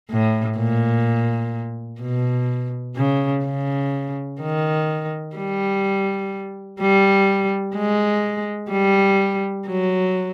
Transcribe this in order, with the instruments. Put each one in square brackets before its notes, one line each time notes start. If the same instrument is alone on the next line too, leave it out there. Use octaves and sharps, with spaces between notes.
[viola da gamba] A2
A#2
B2
C#3
C#3
D#3
G3
G3
G#3
G3
F#3